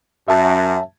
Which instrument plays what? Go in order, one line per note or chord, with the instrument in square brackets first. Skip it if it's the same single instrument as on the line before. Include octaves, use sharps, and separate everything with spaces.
[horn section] F#2 [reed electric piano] E5 A5